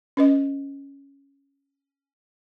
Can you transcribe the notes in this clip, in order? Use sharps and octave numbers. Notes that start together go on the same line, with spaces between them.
C#4 B4 D#5